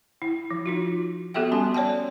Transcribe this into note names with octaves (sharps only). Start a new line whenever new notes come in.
E4
F3
D#4 F4 F#4
B3 F#4 G4 A4 E5 G5
G3 C#4 G#5 C6
C#5 D5 G5 A5